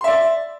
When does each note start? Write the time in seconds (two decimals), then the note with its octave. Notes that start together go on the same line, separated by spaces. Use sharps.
0.01 C6
0.04 E5
0.07 D5